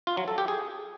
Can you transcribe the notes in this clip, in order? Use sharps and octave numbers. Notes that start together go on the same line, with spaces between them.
F4
F#3
A4
G4
G#4